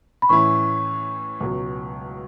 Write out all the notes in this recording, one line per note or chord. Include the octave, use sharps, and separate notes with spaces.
B5
A2 E3 C#4 E4 C#6
C#2 B2 F#3